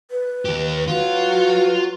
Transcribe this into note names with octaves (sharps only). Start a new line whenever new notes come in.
B4
D#2 G4
F#3 F4 F#4 B4